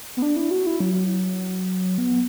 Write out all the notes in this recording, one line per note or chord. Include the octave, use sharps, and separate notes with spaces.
B3
D4
E4
F#4
E4
F#3
B3